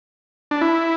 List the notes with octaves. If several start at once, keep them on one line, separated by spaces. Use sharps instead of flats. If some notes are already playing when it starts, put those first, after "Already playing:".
D4
E4